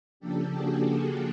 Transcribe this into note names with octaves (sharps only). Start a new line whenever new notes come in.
C#3 F3 A#3 D4 G4 A4
F#4 G#4